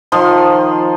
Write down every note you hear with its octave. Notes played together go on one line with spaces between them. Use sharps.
D#3 F3 C6